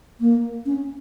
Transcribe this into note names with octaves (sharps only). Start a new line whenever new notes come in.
A#3
C#4